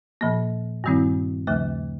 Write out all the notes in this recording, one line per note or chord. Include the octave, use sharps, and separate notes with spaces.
A#2 F3 A#3
G2 D#3 G3 C4 E4
D#2 C#3 F3 A3